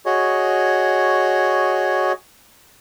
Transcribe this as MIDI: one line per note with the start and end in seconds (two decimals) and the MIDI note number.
0.06 2.12 66
0.06 2.12 68
0.06 2.12 73
0.06 2.12 75